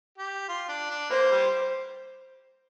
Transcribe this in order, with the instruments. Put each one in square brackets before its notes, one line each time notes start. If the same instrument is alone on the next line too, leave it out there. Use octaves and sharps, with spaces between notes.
[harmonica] G4
F4
D4
D4
[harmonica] A#3 [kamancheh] C5
[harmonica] G3